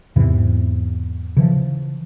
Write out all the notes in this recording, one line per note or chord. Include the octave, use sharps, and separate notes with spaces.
E2 G#2 C3 E3
C#3 E3 F3